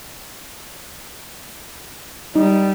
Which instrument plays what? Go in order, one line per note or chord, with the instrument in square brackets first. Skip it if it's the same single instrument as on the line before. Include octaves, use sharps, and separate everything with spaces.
[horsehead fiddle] G3 [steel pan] D#4